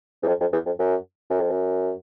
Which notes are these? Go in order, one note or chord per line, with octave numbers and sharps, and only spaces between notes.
E2
F2
F2
E2
F2
F#2
F#2
F2
F#2